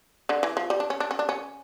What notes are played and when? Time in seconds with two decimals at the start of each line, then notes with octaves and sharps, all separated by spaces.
0.29 D3
0.43 E3
0.57 F3
0.70 G3
0.80 D4
0.90 C#4
1.00 D4
1.11 C#4
1.19 D4
1.29 C#4